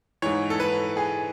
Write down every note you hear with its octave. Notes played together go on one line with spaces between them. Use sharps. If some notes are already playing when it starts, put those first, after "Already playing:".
G#2 E3 C#5
A4
B4
G#4